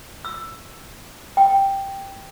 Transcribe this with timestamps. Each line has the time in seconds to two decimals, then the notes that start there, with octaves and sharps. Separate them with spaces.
0.25 E6
1.37 G5